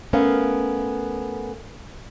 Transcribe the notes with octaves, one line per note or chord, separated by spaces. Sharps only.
A3 B3 C#4 A#4 F5